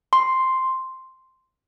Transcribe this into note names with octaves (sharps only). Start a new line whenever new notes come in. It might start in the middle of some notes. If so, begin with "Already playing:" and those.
C6